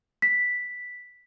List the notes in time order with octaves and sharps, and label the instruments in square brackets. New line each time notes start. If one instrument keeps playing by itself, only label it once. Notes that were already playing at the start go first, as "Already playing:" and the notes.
[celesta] B6